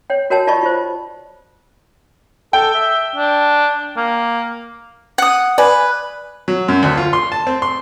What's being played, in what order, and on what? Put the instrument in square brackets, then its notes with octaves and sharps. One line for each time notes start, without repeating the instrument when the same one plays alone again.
[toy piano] C#5 G5
F#4 A#4 C#5 G5 A5
F4 D5 D#5 A5 B5 C#6
F4 C5
[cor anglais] A4 [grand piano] G5
[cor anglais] E5
D4
A#3
[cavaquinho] F#5 D#6
[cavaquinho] B4 [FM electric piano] D5 G#5
[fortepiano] F#3
F#2
D2
F4
C6
A5
C4
C6